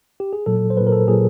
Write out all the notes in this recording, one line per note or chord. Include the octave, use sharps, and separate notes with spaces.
G4
G#4
A#2 F#3 A4
C5
A#2 F#3 B4
A#4
A4
A#2 F#3 G#4